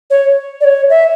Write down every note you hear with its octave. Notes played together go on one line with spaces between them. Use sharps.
C#5
D5
C#5
E5